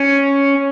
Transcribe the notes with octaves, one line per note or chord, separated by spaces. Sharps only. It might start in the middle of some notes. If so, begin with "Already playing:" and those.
Already playing: C#4